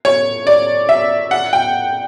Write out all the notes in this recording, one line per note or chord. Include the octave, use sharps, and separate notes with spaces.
C#5
D5
E5
F#5
G5